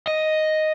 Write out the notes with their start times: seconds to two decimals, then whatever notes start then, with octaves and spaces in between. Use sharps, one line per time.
0.07 D#5